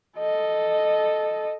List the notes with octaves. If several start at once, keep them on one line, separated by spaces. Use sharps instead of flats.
A4 D#5